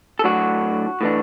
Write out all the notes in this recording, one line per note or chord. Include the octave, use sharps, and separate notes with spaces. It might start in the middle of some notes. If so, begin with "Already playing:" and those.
A4
A2 F#3 D4 F#4
A2 E3 D4